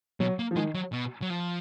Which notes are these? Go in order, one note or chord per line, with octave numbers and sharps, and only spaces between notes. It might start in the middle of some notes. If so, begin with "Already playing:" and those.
B2 F#3
A#3
F3
D#3 G#3
F#3
B2
F#3
F3